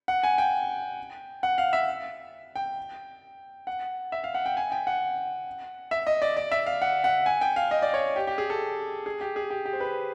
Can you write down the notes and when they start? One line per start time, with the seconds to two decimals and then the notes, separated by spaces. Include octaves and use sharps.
0.08 F#5
0.24 G#5
0.38 G5
1.43 F#5
1.58 F5
1.73 E5
2.56 G5
3.67 F#5
4.12 E5
4.24 F5
4.35 F#5
4.46 G5
4.57 G#5
4.72 G5
4.87 F#5
5.91 E5
6.07 D#5
6.22 D5
6.37 D5
6.52 E5
6.67 F5
6.82 F#5
7.04 F#5
7.26 G#5
7.41 G5
7.56 F5
7.71 D#5
7.82 D5
7.94 C#5
8.16 G4
8.27 G4
8.38 G#4
8.50 A4
9.06 G#4
9.21 G4
9.36 G#4
9.50 G4
9.65 G4
9.73 C5
9.80 B4